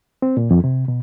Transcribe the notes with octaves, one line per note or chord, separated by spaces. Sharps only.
C4
A#2
F2
C3
B2